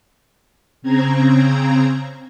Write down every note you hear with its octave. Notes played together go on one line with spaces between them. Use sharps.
C#3 C4 A#5 G#6